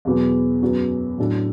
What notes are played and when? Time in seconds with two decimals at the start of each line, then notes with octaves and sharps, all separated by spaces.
0.05 E2 B2 F#3 B3
0.62 F#2 F#3 B3
1.18 A2 F#3 D4 A4